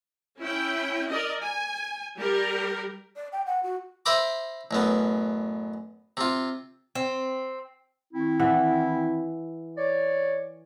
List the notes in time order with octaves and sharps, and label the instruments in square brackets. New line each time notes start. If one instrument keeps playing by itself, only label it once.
[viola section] C#4 E4 G5
A#4 D5 D#5
G#5
G3 G4 A#4
[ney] D5
G5
F#5
F#4
[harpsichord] C5 E5 A#5 B5 D6
A1 F#2 B3
C3 F4
[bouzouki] C4
[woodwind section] D#3 C4 E4
[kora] E3 E5 F#5
[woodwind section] C#5 D5